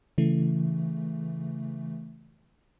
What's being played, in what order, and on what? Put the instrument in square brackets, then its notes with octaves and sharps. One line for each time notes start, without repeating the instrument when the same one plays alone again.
[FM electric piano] C#3 E3 A3